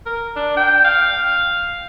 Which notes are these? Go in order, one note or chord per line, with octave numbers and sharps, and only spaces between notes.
A#4
D4
G5
F5